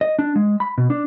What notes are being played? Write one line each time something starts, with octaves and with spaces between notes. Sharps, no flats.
D#5
D4
G#3
B5
B2
D4